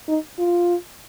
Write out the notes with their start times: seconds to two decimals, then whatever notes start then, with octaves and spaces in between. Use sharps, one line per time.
0.08 D#4
0.39 F4